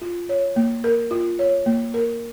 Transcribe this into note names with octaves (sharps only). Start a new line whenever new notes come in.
F4
C#5
A#3
A#4
F4
C#5
A#3
A#4